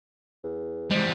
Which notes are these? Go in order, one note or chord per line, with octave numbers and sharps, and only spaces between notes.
E2
E2 G3 G#3 C4